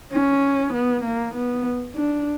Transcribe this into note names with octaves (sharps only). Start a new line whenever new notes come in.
C#4
B3
A#3
B3
D4